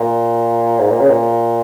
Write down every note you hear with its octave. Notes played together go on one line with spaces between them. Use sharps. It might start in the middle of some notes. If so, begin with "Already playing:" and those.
Already playing: A#2
G#2
A#2
C#3
A#2